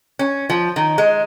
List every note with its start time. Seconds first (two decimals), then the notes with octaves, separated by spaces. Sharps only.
0.19 C#4
0.50 F3
0.76 D#3
0.98 G#3